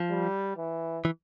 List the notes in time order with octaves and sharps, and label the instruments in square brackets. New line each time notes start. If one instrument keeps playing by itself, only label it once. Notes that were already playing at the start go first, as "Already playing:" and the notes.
Already playing: [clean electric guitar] F3
[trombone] G3
E3
[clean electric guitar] E3